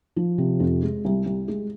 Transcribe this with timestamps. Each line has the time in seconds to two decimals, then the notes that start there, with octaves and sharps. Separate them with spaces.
0.16 F3
0.38 C3
0.60 F2
0.83 G#3
1.05 C2
1.26 C2
1.48 G#3